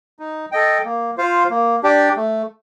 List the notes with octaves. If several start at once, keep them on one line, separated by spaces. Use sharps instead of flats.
D#4
A4 D#5 G5
A#3
F4 C5 F5
A#3
D4 G4 D5 G5
A3